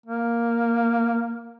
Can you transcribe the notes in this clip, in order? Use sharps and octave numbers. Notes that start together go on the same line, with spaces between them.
A#3